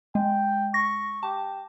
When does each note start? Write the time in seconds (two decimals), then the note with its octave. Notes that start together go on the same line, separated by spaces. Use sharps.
0.15 G#3 G5
0.74 C#6 A#6
1.23 G4 A5